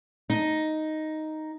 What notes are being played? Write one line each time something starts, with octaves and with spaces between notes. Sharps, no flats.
D#4